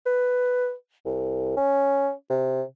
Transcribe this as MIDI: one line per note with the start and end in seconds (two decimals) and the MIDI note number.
0.06 0.73 71
1.05 1.54 36
1.57 2.11 61
2.30 2.63 48